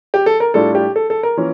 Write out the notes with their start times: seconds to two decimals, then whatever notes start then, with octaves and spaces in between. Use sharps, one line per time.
0.14 G4
0.26 A4
0.40 A#4
0.54 A2 G3 D4 F4 A4
0.75 G4
0.96 A4
1.10 A4
1.23 A#4
1.37 E3 A#3 C#4 F4